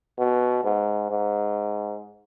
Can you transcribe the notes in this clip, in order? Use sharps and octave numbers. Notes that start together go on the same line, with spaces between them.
B2
G#2
G#2